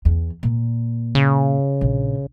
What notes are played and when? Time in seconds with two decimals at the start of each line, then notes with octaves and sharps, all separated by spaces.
0.05 E2
0.43 A#2
1.15 C#3
1.81 A#1